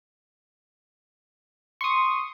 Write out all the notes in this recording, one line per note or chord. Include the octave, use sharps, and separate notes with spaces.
C6 C#6 D#6